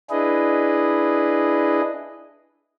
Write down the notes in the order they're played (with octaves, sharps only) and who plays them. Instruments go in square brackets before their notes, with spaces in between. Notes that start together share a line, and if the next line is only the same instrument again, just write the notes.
[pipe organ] D4 E4 G#4 B4 D#5